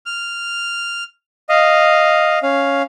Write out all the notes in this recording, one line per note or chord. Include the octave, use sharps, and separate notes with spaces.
F6
D#5 F5
C#4 F5